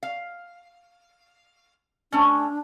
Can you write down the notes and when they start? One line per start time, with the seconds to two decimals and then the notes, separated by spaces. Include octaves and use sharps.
0.03 F5
2.12 A3 C#4 D4